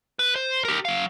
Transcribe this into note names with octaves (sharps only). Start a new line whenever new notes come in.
B4
C5
G4 A#4
F#3 F5